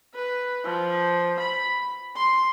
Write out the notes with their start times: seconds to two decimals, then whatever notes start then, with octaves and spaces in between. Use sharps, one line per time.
0.14 B4
0.64 F3
1.40 B5
2.16 C6